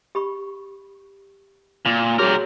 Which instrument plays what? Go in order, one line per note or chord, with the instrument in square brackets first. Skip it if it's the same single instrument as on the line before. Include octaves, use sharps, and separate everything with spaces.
[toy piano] G4 B5 C#6
[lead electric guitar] A#2
[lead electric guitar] G3 A#4 [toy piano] F#4 G#4 C#5